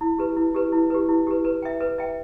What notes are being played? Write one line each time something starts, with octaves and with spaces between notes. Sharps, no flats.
E4
G4 B4
E4
G4 B4
E4
G4 B4
E4
G4 B4
B4
E5 G5
B4
E5 G5